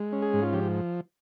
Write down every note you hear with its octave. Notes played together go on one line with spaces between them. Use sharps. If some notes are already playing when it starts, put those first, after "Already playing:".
Already playing: G#3
C#4
G#4
G#2
F4
F3 G4